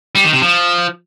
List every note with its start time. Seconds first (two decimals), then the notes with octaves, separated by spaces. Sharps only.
0.15 G3
0.24 D#3
0.33 C3
0.42 F3